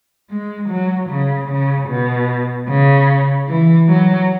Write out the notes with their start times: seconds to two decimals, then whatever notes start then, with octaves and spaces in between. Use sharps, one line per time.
0.30 G#3
0.70 F#3
1.10 C#3
1.50 C#3
1.89 B2
2.69 C#3
3.48 E3
3.89 F#3